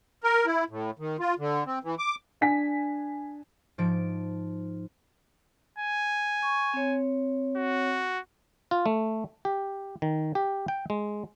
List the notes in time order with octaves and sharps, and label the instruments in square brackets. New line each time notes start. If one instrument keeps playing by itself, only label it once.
[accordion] A#4
E4
A2
D#3
F4
D3
C4
E3
D6
[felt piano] D4 G#5 B6
[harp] G#2 F3 D7
[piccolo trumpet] G#5
[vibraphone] C#6
C4 C#5
[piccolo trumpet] F#4
[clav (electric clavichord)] F4
A3
G4
D#3
G4
G5
G#3